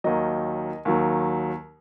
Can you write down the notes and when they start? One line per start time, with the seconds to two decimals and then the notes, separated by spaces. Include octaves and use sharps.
0.04 D#2 D#3 F#3 D#5
0.85 D#2 D#3 F#3